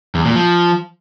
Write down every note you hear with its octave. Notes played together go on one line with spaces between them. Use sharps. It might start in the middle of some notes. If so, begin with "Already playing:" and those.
E2
A#2
F3